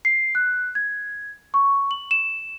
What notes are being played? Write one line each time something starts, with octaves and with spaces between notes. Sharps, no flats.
C7
F#6
G#6
C#6
F#7
E7